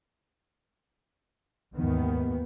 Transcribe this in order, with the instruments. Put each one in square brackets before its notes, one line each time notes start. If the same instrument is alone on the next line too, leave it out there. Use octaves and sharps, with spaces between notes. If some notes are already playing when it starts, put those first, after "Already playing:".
[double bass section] D#2 G#2 D#3 E3 B3